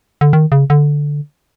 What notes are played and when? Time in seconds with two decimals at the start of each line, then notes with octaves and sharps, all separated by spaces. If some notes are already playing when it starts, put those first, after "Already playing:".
0.21 D3
0.33 D#3
0.52 C#3
0.70 D3